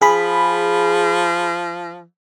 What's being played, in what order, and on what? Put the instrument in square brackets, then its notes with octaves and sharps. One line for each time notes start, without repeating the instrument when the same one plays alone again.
[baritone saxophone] F3 [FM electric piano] G#4 B5